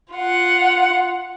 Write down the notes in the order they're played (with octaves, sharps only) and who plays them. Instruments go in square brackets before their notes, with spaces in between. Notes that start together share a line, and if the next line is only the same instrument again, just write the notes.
[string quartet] F4 F#5